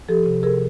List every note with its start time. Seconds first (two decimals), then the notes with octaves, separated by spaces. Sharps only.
0.09 F3 G4 A4
0.26 C3
0.43 C3 G#4 A#4